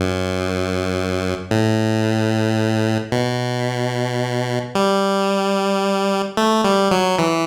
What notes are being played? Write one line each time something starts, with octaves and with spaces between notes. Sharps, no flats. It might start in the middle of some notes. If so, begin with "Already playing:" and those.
Already playing: F#2
A2
B2
G3
A3
G3
F#3
E3